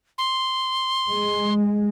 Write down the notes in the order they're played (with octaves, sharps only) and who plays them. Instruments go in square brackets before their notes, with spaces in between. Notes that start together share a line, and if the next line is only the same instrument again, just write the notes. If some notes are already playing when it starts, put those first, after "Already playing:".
[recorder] C6
[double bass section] G#3